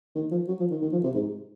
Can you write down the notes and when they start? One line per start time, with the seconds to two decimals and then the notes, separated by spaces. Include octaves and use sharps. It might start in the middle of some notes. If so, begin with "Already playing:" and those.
0.15 D#3
0.31 F3
0.48 F#3
0.60 F3
0.71 D#3
0.82 D#3
0.92 F3
1.04 C3
1.15 G#2